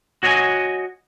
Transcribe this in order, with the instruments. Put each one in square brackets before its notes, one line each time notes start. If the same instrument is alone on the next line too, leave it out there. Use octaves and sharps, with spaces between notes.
[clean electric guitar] F#4 C#5 D#5 F5 G#5